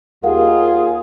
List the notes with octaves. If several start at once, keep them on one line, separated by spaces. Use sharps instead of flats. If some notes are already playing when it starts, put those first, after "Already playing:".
D#2 F4 G#4 A#4 F5 F#5